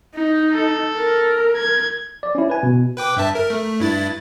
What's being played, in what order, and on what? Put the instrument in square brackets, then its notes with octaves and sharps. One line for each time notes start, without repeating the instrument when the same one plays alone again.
[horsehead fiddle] D#4
[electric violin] A4
[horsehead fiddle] A#4
[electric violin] G#6
[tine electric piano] D5
C#4 E4
B4 G#5
B2
[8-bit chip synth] B4 G5 D6
G2 E5 A5
A#4
A3
G2 E4 A6